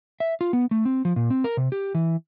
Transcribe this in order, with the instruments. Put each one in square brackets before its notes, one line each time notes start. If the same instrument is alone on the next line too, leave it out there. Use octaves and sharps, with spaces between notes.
[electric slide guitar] E5
F4
B3
A3
C4
F3
A#2
C4
A#4
C3
G4
E3